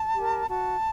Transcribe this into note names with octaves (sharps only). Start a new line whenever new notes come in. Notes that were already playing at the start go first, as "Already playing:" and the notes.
Already playing: A5
G4 A#4
F#4 A5